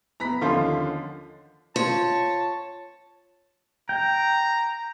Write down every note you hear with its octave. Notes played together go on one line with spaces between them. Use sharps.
B3 A#5 B5 B6
D#2 D3 F3 C#4 F4 C6
F4 C#5 A5
G5 A#5